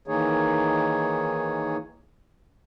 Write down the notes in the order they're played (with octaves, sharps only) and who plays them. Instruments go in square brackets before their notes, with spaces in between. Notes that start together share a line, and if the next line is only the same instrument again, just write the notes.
[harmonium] D#3 E3 A#3 D#4 G#4 C#5